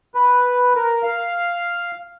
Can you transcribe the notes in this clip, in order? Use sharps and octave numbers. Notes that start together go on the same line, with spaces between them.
B4
A#4
F5